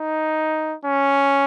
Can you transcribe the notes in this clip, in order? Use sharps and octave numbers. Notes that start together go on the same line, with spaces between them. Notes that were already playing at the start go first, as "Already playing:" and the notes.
Already playing: D#4
C#4